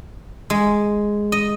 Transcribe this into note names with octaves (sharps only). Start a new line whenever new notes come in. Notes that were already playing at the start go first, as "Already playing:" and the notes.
G#3
D#5